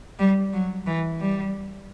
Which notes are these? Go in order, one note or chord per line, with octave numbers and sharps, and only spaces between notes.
G3
F#3
E3
G3